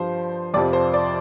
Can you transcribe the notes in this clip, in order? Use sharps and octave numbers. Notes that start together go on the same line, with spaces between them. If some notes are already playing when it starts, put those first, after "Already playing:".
Already playing: G2 F3 C5
F2 C3 F3 D5
C5
D5